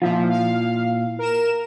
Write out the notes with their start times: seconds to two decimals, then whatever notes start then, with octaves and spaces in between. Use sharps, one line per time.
0.02 A#2 F3 E4 F4
0.29 F5
1.19 A#4 E7